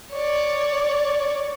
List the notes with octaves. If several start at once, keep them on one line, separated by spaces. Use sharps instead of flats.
C#5 D5